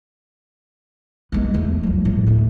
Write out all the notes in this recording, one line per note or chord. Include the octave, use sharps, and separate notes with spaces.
G#3 B3
E2 A3
F3 G3
A2
D2 A3